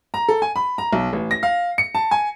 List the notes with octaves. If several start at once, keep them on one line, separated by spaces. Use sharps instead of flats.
A#5
A4
G#5
B5
A#5
B1
A1
A#6
F5
C#7
A5
G#5